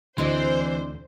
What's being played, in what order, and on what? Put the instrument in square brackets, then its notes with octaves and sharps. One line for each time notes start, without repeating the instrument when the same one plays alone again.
[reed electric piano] D2 [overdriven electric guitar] E3 [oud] C4 D4 D#5 [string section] C5